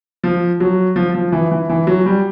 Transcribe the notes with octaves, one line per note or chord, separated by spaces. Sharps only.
F3
F#3
F3
F3
E3
E3
E3
F#3
G3